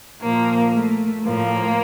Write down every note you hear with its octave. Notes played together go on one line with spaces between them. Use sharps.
A#2 F3 A#3
A3
A2 F3 A#3